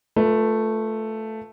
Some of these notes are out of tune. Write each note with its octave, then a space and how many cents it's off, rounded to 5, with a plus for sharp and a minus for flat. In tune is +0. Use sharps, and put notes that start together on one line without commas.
A3 +0 F4 +0 B4 -20